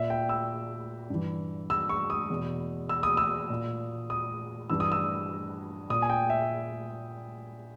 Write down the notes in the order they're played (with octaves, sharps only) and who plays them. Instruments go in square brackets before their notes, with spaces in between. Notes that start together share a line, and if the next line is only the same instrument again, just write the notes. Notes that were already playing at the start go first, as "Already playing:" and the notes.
Already playing: [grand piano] A#2 E5
G5
E6
G2 E3
E6
C#6
D#6
E2 B2
E6
D#6
E6
A#2
D#6
G2 E3 E6
D#6
E6
A#2 D#6
G#5
G5
E5